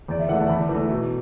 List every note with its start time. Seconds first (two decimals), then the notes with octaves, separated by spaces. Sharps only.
0.08 E2 D5
0.19 E5
0.29 E3 A3 F#5
0.40 A5
0.49 E2 B5
0.69 E3
0.75 A3
0.90 B2